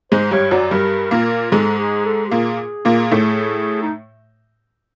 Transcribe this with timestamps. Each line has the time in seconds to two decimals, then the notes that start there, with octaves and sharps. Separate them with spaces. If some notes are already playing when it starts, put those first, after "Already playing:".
0.12 G#2 G#3 C5
0.31 G2 G3 C#5
0.51 F#2 F#3 D5
0.71 G2 G3 A#4
1.11 A#2 A#3 A#4
1.52 G#2 G#3 A4
1.78 G#4
2.06 A4
2.27 G4
2.31 A#2 A#3 G#4
2.85 A#2 A#3
3.11 A2 A3
3.82 D#4